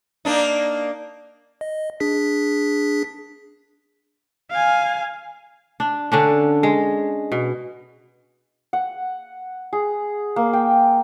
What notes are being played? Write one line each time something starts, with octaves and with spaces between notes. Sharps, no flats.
A#3 D4 D#4
D#5
D4 G#4 B6
F5 G#5
D4
D3 C#4 D4
G#3
B2
F#5
G#4
A#3
G5